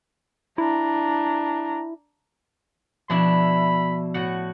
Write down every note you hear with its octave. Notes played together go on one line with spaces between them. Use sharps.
D4 E4 A#5
B2 F3 D4 E4 B5
A2 F#4 F#5